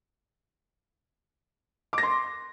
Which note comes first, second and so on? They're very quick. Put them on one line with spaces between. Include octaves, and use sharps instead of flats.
D6 A#6 C6